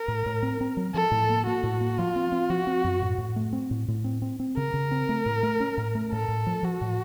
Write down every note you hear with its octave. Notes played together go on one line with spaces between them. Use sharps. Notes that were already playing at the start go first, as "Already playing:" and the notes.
Already playing: A#4
A2
A2
C4
C4
F#3
F3 A4
A2
A#3
A#3 F#4
A2
A#3
F3 F4
C4
C4
F3 F#4
C4
F#2
A2
A2
A3
C4
A2
A2
C4
C4
C4
C#3 A#4
C#3
C4
A3
A2
A3
C#4
A2
A3
A2 A4
A2
F3
F3 F#4
A2